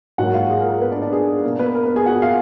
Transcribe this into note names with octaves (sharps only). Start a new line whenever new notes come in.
G#2 F#3 A#3 F#4 F#5
F4 F5
G#4
A#4
A#4
B3 B4
D4 D5
D4 D5
G#4
B2 A#3 A#4
B3 B4
A#4
B3 B4
G#4 G#5
F#4 F#5
F4 F5